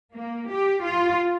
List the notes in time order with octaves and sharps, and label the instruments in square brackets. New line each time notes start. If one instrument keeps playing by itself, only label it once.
[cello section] A#3
G4
F4